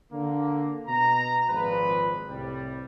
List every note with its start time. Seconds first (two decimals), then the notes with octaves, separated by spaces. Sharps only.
0.12 D3 A#3
0.88 B2 A#5
1.49 G#1 A#2 F3 B4
2.28 C2 A2 G3